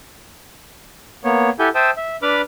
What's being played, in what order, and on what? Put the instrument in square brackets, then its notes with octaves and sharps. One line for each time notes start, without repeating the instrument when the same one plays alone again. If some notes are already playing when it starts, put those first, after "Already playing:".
[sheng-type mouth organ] A#3 B3 C#5
E4 G4 A4 F#5 G#5 G6
C5 E5 G5 A5 D#6 E6
E5
D4 B4 B5 D6 F6